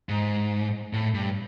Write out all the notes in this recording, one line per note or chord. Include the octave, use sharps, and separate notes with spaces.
G#2
A2
G2